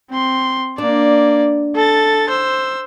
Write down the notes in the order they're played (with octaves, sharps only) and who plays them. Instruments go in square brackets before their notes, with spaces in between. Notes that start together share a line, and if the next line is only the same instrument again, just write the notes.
[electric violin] C4 C6
[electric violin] A#3 D5 [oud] D4
[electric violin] A4 A6
C5 E6